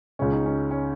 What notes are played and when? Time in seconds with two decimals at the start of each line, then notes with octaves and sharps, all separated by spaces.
0.19 C#2 C#3 C#4
0.32 D#4
0.46 C#4
0.71 C#4